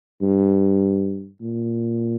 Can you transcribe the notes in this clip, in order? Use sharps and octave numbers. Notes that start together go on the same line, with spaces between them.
G2
A#2